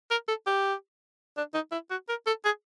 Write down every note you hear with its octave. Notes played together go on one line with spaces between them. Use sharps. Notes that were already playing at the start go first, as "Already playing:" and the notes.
A#4
A4
G4
D4
D#4
E4
F#4
A#4
A4
G#4